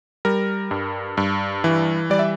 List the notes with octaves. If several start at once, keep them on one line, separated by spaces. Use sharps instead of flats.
G3 A#4
G2
G2
E3
G3 D5
E5